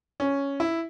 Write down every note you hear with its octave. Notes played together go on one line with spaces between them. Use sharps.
C#4
E4